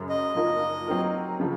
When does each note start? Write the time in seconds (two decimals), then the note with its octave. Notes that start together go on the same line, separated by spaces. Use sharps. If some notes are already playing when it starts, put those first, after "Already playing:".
Already playing: F#2 C#3 F#3
0.09 D#5
0.35 A#2 F3 A#3 D#4
0.87 F#3 C4 D#4 A#4
1.40 C#3 F3